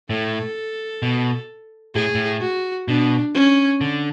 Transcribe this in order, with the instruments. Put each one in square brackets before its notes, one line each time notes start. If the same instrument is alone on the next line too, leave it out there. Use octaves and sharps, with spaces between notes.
[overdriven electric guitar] A2 [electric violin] A4
[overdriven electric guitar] B2
[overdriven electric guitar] A2 [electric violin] G#4
[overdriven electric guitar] A2
[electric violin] F#4
[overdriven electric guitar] B2 [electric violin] D4
[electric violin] C#4
[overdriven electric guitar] D3